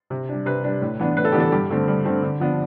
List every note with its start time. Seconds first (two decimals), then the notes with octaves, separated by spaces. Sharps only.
0.10 C3
0.29 G3 D4
0.46 C3 B4
0.64 G3 D4
0.82 A2
0.99 E3 B3 D4
1.17 A2 B4
1.25 A4
1.32 E3 B3 D4 G4
1.40 A4
1.52 G2 G4
1.70 D3 A3 C4
1.88 G2
2.05 D3 A3 C4
2.23 D3
2.40 F3 B3 D4